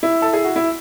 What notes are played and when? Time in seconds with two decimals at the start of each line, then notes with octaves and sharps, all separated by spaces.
0.03 E4
0.22 A4
0.33 G#4
0.44 F#4
0.56 E4